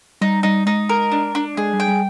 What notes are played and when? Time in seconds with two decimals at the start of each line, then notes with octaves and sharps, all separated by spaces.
0.21 G3 D#4
0.43 G3 D#4
0.66 G#3 D#4
0.89 A#4
1.12 D4
1.35 D4
1.57 G#3 G#4
1.73 G3
1.80 G5
1.88 G3